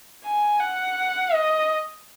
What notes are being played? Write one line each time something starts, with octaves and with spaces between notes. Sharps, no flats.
G#5
F#5
D#5